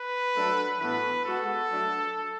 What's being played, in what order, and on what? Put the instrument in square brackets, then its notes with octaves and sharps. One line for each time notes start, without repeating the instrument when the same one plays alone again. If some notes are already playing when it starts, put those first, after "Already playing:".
Already playing: [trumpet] B4
[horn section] F#3 A3 D4 A4
[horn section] A2 E3 B3 F#4 A4 [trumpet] B4
[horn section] G#3 B3 F#4 [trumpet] A4
[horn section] F#3 A3 D4